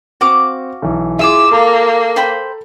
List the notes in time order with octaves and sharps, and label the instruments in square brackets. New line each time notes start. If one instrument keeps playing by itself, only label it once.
[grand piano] C4 [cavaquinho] F#4 F5 D6
[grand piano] B1 E3
[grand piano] E4 G#4 [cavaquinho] F4 C6 D6 [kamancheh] E6
[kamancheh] A#3 [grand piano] A4 A#5
[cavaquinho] C5 G5 B5